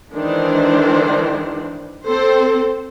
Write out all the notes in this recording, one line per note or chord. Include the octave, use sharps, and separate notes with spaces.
D#3 E3 G#3 D4 C5
C4 A4 C5